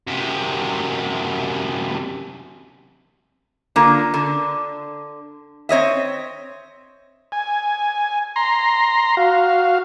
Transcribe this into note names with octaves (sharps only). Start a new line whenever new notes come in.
F#2 C3
D3 A#3 F4
D3
C4 C#5 D#5 E5
G#5
A#5 C6
F#4 F5